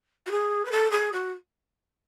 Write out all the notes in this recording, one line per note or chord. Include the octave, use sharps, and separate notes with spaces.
F#4
G#4
B4
A4
G#4
F#4